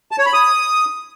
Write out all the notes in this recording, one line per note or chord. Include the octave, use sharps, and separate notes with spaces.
A5
C#5
B5
D#6